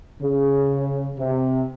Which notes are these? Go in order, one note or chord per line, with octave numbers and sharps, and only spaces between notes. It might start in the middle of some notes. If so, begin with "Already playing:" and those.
C#3
C3